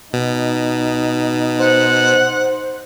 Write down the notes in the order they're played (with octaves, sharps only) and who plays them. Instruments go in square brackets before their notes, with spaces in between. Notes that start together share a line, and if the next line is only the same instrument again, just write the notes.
[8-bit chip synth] B2 [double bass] D#4
[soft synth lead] C5 [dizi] F#5